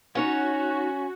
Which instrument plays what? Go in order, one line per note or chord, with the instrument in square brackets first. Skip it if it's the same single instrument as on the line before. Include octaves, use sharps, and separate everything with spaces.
[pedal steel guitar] C#4 [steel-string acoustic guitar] D#4 C#5 F#5 [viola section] F#4